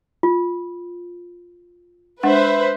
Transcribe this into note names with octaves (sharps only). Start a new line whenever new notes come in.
F4
G#3 D4 B4 C5 E5 F#5